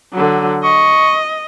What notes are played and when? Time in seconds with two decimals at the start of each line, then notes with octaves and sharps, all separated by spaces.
0.13 D3 F#3
0.64 D#5 C#6